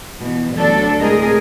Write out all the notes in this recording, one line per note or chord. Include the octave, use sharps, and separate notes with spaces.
B2 E3
D2 F#3 D4 A4
A2 C3 G#3 G#4 A#4 D#5